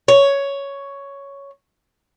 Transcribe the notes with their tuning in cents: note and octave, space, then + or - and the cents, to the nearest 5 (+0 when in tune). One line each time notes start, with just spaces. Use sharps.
C#5 +5